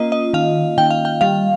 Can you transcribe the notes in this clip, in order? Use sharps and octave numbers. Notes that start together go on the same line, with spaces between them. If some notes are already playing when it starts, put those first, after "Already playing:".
Already playing: A#3 C#4 F4 D#5
D#5
D#3 F5
D#3 G5
F5
G5
G3 F5